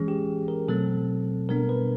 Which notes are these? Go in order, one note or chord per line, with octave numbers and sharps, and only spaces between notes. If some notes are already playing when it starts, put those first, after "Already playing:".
Already playing: E3 G#3 C#4 G#4
G4
A#4
B2 F#3 A3 C4 A4
B2 G3 B3 D4 A#4
B4